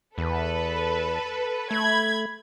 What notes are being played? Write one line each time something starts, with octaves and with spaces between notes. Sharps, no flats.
E2 A4 B4
A3 B5 G#6